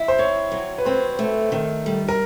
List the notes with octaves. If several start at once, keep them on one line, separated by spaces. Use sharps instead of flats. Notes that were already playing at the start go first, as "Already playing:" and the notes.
Already playing: E4
C5
C4 C#5
F#3
B4
C4 C5
A3
D#3
G3
A#4